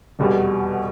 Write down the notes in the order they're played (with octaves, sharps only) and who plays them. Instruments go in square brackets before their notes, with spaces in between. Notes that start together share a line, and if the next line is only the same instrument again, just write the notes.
[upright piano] F1 E2 B2 G3